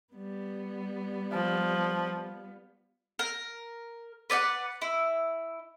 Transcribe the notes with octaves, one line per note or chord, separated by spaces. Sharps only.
G3 B3
F3
A#4
B4 D5 E5 F#5
E4